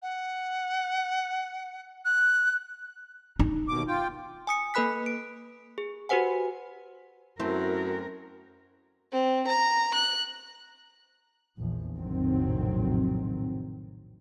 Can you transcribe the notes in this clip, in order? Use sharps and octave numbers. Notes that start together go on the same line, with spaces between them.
F#5
F#6
D#4
D#2 B2 D6
F4 G5
G#5 D#6 C#7
A#3 A4 B4 B5 F#6 B6
D7
G#4
F#4 G4 B4 C5 F#5 G#5
F#2 A3 C4 E4 A#4
C4
A#5
F#6
A#1 E2 F3
F1 A#1 A2 D#3 F#3 C4